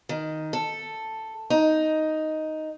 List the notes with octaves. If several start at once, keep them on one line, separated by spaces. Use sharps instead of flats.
D#3
A4
D#4